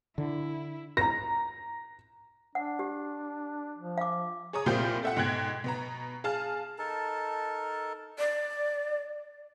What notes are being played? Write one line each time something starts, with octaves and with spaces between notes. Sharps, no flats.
D3 E4
A#5 A#6
D4 F#5
G4
F3
F5 D6
G#4 C#5 A#5 D#6
C2 A#2 F4 G4 C5 G6
A4 E5 F#5
G#2 B2 G5 F#6 G#6
B2 B3 A#5
G#4 F5 A5 F6
D#4 A4 A#4 A5
D5